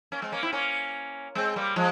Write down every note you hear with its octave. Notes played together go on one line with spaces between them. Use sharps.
A#3 C#4
G#3 C4
A#3 C#4
C4 E4
A#3 C#4
G#3 C4
G3 A#3
F3 G#3